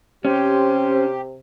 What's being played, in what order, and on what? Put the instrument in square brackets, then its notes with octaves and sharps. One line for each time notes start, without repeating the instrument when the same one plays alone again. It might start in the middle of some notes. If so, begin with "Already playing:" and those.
[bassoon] C3 [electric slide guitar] C#4 [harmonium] G4 [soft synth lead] C5